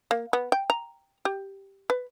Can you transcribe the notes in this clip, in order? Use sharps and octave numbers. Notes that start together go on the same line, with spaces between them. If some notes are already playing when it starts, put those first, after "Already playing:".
A#3
B3
G5
A#5
G4
B4